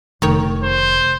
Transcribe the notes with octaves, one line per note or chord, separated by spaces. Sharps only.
F1 D#3 C#5
C5